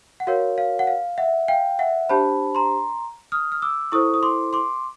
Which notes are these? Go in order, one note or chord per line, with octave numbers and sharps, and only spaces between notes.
F#5
F#4 A#4 C#5 F5
F5
F#5
F5
E5 F#5
F5 G5
E5 F#5
D4 G4 C5 A5 B5
A#5 C6
D#6 F6
F6
D6 E6
E4 A4 C5 C#6 D#6
D#6
C6 D6
C6 D6